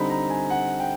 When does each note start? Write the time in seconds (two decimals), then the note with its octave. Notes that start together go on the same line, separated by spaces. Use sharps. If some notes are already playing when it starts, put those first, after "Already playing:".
Already playing: D3 G3 C4 D#4 B5
0.10 A#5
0.30 G#5
0.50 F#5
0.80 G5